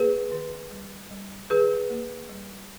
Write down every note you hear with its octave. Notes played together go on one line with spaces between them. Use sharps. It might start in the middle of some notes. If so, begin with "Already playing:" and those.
Already playing: A#3 G#4 B4
D#3
G3
G3
D#3 G#4 B4
A#3
G3